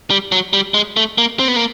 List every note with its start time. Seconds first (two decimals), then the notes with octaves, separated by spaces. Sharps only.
0.10 G3
0.32 F#3
0.53 G3
0.74 G#3
0.97 A3
1.18 A#3
1.39 C4
1.48 B3
1.56 A#3